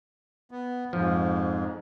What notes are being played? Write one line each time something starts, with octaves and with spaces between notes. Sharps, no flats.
B3
F2 G#2 F3